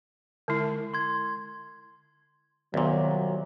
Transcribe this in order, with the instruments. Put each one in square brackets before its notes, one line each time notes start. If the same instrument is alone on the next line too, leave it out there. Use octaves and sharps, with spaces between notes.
[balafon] D3 G#3 E4
[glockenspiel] C6 G#6
[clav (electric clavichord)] C2 A#2 [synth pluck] D#3 B3 [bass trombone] F#3